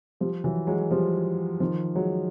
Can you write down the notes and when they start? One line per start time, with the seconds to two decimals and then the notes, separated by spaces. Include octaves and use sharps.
0.21 F3 G3
0.44 E3 F#3
0.67 F#3 G#3
0.91 F3 G3
1.60 D#3 F3
1.95 F#3 G#3